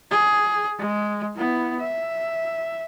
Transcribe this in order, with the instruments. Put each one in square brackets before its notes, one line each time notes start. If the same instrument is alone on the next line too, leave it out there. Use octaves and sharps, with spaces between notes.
[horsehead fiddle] G#4
G#3
B3 E4
E5